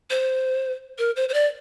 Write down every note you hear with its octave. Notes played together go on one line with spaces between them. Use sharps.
C5
A#4
C5
C5
D5